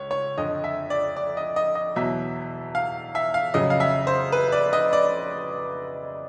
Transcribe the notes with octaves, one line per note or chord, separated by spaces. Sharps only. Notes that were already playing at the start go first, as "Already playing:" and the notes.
Already playing: C#2 C#5
C#5
F2 D3 F3 D#5
E5
D5
D5
D#5
D#5
D#5
E2 B2 F#3 E5
F5
E5
F5
F2 C#3 F#3 D#5
F5
E5
C5
B4
D5
D#5
D5